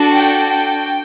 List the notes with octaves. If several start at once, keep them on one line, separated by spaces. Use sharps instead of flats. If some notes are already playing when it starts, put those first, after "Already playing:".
Already playing: D4 F#4 A4
G5
G5